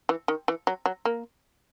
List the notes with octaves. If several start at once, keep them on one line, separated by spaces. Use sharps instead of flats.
E3
D#3
E3
F#3
F#3
A#3